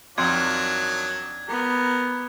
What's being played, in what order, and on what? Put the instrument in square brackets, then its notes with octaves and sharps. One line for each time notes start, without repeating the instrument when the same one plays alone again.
[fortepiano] F2 C6 [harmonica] D#3 F#3 D4 [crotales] G#6
[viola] B3 [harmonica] G4 A#4